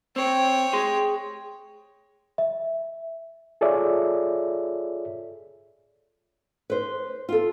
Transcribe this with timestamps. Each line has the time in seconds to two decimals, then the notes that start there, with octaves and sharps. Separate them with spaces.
0.16 C4 C#5 G5
0.73 G#4 C6
2.38 E5
3.61 F4 G#4 A4 C#5 D5 E5
6.70 B4 C5
7.29 F4 A4